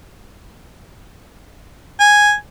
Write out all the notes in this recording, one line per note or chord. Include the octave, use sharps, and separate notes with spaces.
G#5